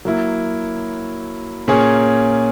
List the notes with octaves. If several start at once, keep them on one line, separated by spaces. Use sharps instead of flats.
F#3 A#3 E4
A#2 A#3 C#4 G#4 C#5